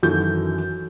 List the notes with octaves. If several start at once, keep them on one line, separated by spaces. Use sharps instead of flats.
F#2 D#3 E3 F#4 A4 G6